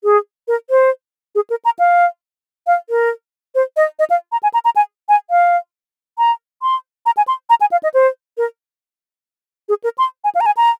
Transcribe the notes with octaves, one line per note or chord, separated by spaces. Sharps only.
G#4
A#4
C5
G#4
A#4
A#5
F5
F5
A#4
C5
D#5
D#5
F5
A#5
G#5
A#5
A#5
G#5
G#5
F5
A#5
C6
A#5
G#5
C6
A#5
G#5
F5
D#5
C5
A#4
G#4
A#4
C6
G#5
F5
A#5
G#5
A#5